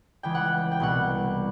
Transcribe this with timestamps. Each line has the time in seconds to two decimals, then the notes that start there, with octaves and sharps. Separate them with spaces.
0.23 C#2 C#3 E3 G5
0.35 F#5
0.45 G5
0.72 G5
0.80 C2 B2 F#5